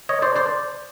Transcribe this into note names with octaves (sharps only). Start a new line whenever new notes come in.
C#5 D#5
C5 D5
C5 D5